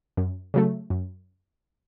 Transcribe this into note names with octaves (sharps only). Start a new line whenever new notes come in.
F#2
C#3 F#3 A3
F#2